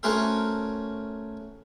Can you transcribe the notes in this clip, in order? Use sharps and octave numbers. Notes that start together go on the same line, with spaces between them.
A3 C#4 F#4 A#4 C5 E5